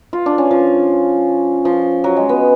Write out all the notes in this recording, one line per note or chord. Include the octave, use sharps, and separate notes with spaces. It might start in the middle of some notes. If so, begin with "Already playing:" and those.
F4
D4
C#4
F3
F3
F#3
G#3
B3